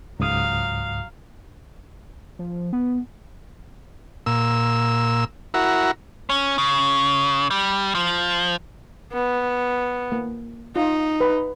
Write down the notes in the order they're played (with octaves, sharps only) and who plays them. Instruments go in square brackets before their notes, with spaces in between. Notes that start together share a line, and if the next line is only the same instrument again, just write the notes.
[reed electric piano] C#2 G#2 D#6 [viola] F#3 F5
[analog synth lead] F3
B3
[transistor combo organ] A#2 E6
E4 F#4 A#4
[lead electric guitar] C#4
C#3
G3
F3
[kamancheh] B3
[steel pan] A#3
[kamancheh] D#4 [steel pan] F4
[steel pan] B4